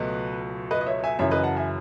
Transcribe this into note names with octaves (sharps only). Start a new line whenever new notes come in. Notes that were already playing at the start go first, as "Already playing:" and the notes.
Already playing: C#2 B2 F#3 A3 B4 D#5
B4 D#5
D#5
C#5 E5
E5 G#5
F#2 C#3 E3 C#5 E5
B4 D#5
F#5 A5
E5 G#5